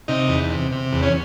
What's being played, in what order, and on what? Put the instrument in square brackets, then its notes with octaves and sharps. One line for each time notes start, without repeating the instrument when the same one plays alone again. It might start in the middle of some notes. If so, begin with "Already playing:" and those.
[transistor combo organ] C3 D#4
E2
C3
C3
E2
C#4